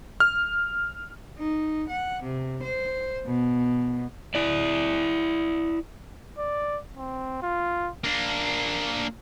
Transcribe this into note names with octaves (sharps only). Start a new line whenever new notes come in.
F6
D#4
F#5
C3
C5
B2
E4 D5
D5
C4
F4
A#3 D4